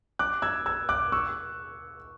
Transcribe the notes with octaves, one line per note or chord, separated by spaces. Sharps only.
D6 F#6
E6 G#6
E6 G#6
D6 F#6
C#6 E6